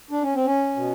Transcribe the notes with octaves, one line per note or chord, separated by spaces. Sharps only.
D4
C#4
C4
C#4
B2